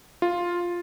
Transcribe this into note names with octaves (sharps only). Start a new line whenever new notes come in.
F4